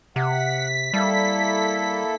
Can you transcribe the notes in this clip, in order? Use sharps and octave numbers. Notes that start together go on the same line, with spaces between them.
C3 F#5 B6
G3 A#3 E4 A4